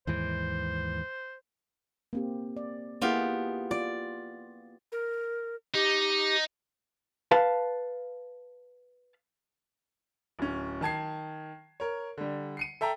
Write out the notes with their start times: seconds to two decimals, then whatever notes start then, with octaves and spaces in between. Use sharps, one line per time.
0.07 D#2 G#2 E3 C5
2.13 A#3 C4 G4
2.57 D5
3.02 A#3 B3 E4 F4 G4 G#4
3.71 F4 D5
4.92 A#4
5.74 D#4 G4
7.31 B4 F5 A5
10.39 D1 C#4
10.81 D#3 A5 G#6 C7
11.80 A#4 C#5
12.18 D3 G3
12.57 C7 C#7 D#7
12.81 A4 E5 G5 A#5